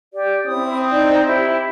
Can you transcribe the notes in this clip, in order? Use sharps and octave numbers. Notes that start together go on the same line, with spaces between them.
G4 D5
C4 E4 D#6
D#4 D5 G6
E4 G4